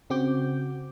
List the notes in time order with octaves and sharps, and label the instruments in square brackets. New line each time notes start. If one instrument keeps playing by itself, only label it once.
[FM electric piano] C#3 C4 F#4 D6 G6